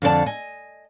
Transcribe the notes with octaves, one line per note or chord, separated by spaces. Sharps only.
F2 D3 F4 D5 A5
D#5 G#5